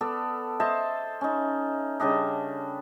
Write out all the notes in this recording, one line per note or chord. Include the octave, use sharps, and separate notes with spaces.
B3 A4 D5
C5 D#5 E5 A5
C#4 D#4
C#3 G3 D4 D#5